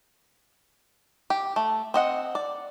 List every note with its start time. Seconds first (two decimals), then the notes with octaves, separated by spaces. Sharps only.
1.30 G4
1.56 A3
1.94 C4 D#5 F#5
2.35 D5